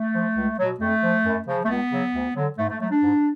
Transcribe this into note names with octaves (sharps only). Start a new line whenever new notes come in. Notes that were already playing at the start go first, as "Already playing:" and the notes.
Already playing: A3
F3
C#2
B2 F#3
F2 A3
F3
F#2
C#3 F3
A3
C#2 B3
C#3 F#3
D2
D3 F#3
G#2 A3
A3
F#3 A3
D4
G#2